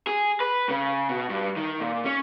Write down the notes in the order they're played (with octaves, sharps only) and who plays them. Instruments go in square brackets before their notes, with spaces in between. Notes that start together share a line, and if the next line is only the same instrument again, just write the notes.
[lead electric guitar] G#4
B4
C#3
B2
G2
D#3
A#2
C#4